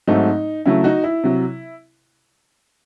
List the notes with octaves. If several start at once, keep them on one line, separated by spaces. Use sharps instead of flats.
G#2 F#3 A3 C4 D#4
C#3 F#3 A3 E4
D#4 F#4
E4
C3 F#3